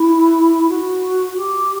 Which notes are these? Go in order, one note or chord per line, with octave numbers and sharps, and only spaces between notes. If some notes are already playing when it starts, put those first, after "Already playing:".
Already playing: E4
F#4
G4